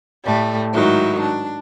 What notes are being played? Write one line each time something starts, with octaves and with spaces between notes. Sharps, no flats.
A2 G3 A3
G#2 D#3 F#3 E4
D4